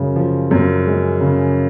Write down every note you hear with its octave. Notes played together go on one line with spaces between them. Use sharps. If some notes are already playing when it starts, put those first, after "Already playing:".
Already playing: F#2 C#3 G#3
F3
F#2
G#3
C#3